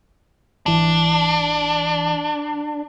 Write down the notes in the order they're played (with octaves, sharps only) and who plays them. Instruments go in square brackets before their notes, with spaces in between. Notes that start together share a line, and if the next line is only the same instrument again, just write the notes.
[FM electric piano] G#1 E3 [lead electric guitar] D4